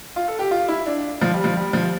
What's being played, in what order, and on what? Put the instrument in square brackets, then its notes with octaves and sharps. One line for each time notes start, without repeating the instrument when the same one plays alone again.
[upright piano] F4
A4
G4
F4
E4
D4
F3
G3
F3
G3
F3